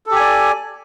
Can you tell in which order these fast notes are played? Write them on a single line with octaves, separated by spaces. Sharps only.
A4 G4 G#5 D5